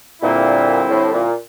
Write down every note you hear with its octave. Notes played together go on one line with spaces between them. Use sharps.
A#2 D3 G3 C4 E4
A2
A#2